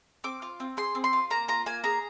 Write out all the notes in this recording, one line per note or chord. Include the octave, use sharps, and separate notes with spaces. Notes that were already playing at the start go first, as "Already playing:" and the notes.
C4 D6
F4
C4
G#4 C6
C4
C6
F4
A#3 A#5
F4 A#5
A#3 G#5
G#4 A#5